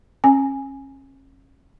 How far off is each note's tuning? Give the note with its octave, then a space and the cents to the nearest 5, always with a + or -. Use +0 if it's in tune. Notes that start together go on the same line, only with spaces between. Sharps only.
C#4 -35 G#5 +0